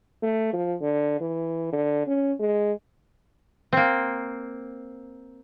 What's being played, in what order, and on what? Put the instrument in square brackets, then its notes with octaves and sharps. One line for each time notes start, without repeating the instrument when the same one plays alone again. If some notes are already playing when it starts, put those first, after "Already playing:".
[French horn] A3
F3
D3
E3
D3
C#4
G#3
[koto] A#3 C4